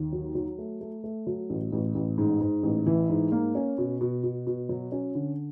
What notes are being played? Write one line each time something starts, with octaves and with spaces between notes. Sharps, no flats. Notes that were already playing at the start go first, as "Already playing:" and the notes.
Already playing: D#2
F#3
F#3
A3
A3
A3
F#3
A1
A1
A1
G#2
G#2
A1
E3
G#2
A#3
C#4
B2
B2
B2
B2
F#3
C#4
D3